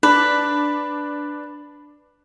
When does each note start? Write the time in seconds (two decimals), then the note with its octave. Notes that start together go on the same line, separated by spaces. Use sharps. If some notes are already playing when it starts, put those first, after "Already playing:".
0.03 D4 B4